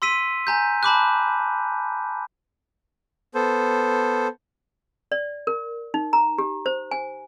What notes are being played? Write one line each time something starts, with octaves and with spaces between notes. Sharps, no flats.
C6 E6 B6 D#7
G#5 A#5 G6
A5 B5 D6 F#6
B3 A4 C5
D5
A#4
D#4
A#5
G4
C5
G#5